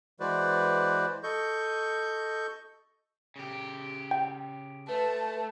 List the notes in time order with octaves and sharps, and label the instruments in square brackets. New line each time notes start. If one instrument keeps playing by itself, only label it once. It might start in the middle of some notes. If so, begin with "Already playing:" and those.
[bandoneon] E3 G#3 F#4 B4 C5 D5
A4 D#5 C#6 G6
[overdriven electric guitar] C#3 G4
[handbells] G5
[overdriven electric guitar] A3 [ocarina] B4 [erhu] A5